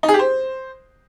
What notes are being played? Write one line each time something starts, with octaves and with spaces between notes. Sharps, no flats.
D#4
G#4
G4
C5